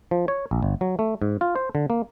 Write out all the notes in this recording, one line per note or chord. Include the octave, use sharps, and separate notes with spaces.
F3
C#5
A#1
G1
F#3
A3
G#2
F4
C5
D3
A#3